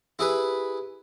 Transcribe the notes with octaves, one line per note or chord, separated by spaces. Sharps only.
E4 G4 G#4 B4